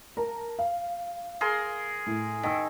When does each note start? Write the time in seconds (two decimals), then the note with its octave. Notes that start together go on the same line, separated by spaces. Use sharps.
0.17 A#4 A5 A#5
0.59 F5
1.41 G#4 A#4 C6
2.07 A2
2.43 D#3 A5 E6